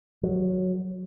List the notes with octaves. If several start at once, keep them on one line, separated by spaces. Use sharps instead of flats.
F#3